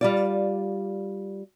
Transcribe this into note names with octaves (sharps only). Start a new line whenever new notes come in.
G3 F4 D5